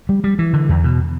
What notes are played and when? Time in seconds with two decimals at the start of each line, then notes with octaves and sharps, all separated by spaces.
0.09 G3
0.24 G3
0.39 E3
0.53 D3
0.69 E2
0.84 B2